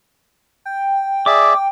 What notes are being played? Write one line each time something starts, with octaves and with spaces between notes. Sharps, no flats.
G5
G#4 D5 E5 D6